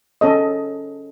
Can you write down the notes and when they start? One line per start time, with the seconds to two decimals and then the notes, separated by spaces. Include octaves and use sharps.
0.21 C#4 A4 D#5